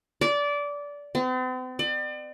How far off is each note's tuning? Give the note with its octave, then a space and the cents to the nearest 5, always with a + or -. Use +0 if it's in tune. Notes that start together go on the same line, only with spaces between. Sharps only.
D5 -20
C4 -45
D5 +35